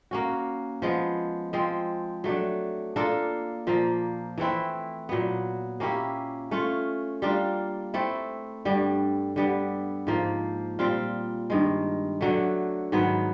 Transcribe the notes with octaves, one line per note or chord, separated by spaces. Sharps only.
A#3 C#4 F#4
F3 G#3 B3
F3 G#3 C4
F#3 A3 D4
A#3 D4 F4 A4
A#2 F3 A#3
E3 A3 C4 E4
A#2 F#3 B3
A#3 C#4 E4 G4
A3 C#4 F4
G3 A#3 D4 F4
A3 C4 E4
G2 D3 G3
D3 G3 B3
G#2 F3 A#3
A#2 G3 C4 F4
G2 D#3 G#3
D3 F#3 A3
G#2 D#3 F#3 B3